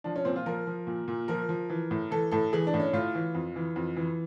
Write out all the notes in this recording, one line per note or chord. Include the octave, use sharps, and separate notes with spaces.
F3 D4
C#4
A#2 C4
F4
F3 A#4
F3
A#2
A#2
F3 A#4
F3
E3
A2
E3 A4
A2 A4
E3 G#4
D4
A2
C#4
A2 F4
E3
F2
E3
F2
E3